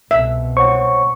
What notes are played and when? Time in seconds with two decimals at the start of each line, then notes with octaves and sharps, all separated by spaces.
0.11 C2 B2 E5
0.57 C5 C#5 F#5 C#6